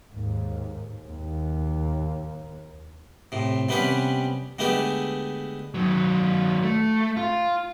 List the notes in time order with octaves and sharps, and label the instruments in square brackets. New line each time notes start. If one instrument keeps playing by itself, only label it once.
[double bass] D#2 G#2
D#2
[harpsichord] A2 C3
C3 G3 B3 C#4 G4 B4
D3 G#3 A3 B3 G4 G#5
[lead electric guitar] D#3 F#3
A3
F4